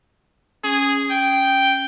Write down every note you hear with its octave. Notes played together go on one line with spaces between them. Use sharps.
C#4 G#4
G5